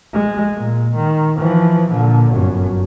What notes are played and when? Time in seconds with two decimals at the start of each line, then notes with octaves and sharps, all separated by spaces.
0.13 G#3
0.55 A#2
0.95 D#3
1.39 E3 F3
1.91 A#2 D3
2.30 G1 F#2